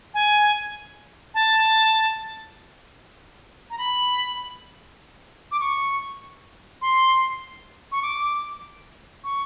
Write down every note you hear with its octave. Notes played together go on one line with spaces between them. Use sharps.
G#5
A5
A#5
B5
D6
C#6
C6
C#6
D6
C#6